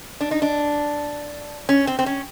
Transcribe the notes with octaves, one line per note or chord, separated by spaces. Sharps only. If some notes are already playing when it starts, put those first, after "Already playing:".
D4
D#4
D4
C#4
C4
C4
C#4